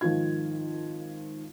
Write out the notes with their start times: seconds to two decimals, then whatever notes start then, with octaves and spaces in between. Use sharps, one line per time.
0.01 G#1 D#3 F3 F4 G#6